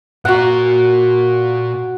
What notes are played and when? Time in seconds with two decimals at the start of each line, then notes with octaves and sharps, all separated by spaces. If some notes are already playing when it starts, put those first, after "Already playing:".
0.25 A#2 F#4 F#5 A#5